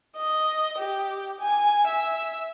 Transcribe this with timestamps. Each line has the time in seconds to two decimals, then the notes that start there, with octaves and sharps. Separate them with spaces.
0.16 D#5
0.78 G4
1.41 G#5
1.87 E5